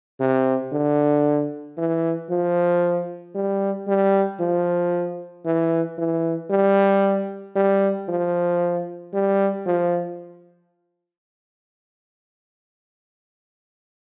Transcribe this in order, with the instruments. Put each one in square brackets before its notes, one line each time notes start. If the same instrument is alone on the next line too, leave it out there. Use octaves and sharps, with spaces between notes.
[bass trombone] C3
D3
E3
F3
G3
G3
F3
E3
E3
G3
G3
F3
G3
F3